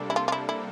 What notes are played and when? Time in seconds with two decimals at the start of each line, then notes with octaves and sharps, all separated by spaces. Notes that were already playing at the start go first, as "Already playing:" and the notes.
Already playing: C3 G3 A#3 D4 A4
0.10 E4
0.16 F4
0.28 F4
0.32 E4
0.49 E4